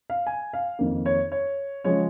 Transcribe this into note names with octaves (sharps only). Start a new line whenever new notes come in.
F5
G#5
F5
F2 D#3 A#3
C#5
C#5
C#3 F3 G#3 C#5